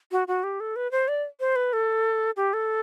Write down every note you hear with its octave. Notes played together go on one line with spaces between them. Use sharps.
F#4
F#4
G4
A4
B4
C5
D5
C5
B4
A4
G4
A4